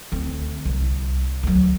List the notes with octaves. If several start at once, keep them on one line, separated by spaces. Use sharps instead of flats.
D2 C4
C2
D2 F#3